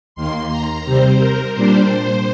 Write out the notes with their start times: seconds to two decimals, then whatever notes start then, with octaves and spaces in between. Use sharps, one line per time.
0.15 D#2 D#3 A#3 C6
0.51 A#5
0.85 C3 G3 C4 C5
1.19 A#4
1.54 A#2 G3 D4 C5